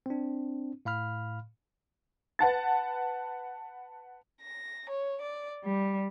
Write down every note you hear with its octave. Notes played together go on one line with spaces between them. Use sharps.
C4 D4
A2 F5 B5 F6
B4 F#5 A5 A6
A#6
C#5
D5
G3